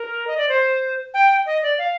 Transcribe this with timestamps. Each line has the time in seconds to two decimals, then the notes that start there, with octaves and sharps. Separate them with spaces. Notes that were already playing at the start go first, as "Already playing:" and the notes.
Already playing: A#4
0.27 D#5
0.37 D5
0.49 C5
1.14 G5
1.46 D#5
1.63 D5
1.78 F5